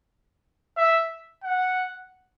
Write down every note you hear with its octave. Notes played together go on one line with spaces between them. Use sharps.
E5
F#5